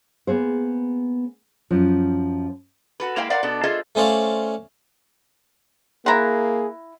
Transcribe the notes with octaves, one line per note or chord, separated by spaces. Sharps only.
A#3 B3 G#4 C5
F#2 F3
F#4 A4 B4
G#3 A#3 E4 C5 F5 G5
A#4 C5 D5 F5 F#5
B2 B3 D4 A4
F4 G#4 A4 C5 D#5 E5
A3 C#4 C5 D5 F5
A#3 E4 G#4 F#5 A#5 C6